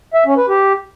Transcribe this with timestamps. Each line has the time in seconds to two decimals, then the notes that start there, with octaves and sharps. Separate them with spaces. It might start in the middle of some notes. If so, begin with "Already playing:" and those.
0.14 E5
0.26 C#4
0.37 B4
0.49 G4